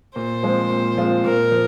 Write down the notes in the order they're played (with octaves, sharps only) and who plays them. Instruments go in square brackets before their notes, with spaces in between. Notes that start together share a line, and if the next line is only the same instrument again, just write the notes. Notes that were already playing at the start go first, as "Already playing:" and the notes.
[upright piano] A#2 [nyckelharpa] C5
[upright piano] F3 G#3 C4 F4
A#2
F3 G#3 C4 F4
[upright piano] A#2 [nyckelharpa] A#4
[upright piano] F3